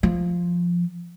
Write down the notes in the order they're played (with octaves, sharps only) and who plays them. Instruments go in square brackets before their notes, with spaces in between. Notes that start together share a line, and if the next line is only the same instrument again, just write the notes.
[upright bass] F3